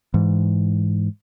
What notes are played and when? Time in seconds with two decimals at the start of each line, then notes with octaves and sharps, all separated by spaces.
0.14 G#2 E3